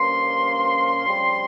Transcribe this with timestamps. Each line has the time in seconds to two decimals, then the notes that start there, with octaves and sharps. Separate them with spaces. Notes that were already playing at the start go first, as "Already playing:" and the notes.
Already playing: G2 F3 A#3 C#4 C6
1.05 F2 C#3 G3 C4